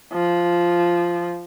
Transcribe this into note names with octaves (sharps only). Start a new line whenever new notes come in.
F3